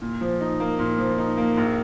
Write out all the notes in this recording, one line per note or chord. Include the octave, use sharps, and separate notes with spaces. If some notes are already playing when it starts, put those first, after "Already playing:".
A#2
F3
D#4
A#3
A#2
F3
D#4
A#3
A#1